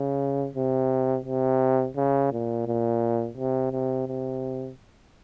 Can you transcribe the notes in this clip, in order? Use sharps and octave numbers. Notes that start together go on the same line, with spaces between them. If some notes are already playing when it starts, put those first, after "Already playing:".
Already playing: C#3
C3
C3
C#3
A#2
A#2
C3
C3
C3